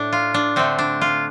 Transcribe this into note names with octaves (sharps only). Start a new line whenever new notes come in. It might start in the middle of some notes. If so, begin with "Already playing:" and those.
Already playing: A2 A3 D4
F4
D4
D3 A3 C4
D4
F4